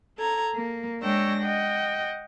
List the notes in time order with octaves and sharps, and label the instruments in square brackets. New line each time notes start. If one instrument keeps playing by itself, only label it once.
[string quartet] A4 A#5 G#6
A#3
G#3 D4 C#5 G5 E6 A#6
D#5 F#5 G5